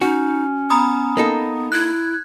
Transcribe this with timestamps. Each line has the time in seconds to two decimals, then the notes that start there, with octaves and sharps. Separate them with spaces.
0.01 C#4 D#4 F#4
0.70 B3 A#5 B5 D#6
1.17 A#3 D#4 A4
1.72 E4 F#6 G#6